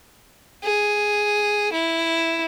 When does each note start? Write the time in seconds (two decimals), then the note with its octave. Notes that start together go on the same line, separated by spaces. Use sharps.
0.64 G#4
1.73 E4